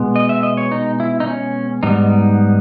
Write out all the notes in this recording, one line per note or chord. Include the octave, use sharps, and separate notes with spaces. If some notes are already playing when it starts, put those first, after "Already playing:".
Already playing: B2 G#3 B3
D#5
E5
D#5
C#5
D#4
E4
D#4
C#4
G#2 G3 B3 D#4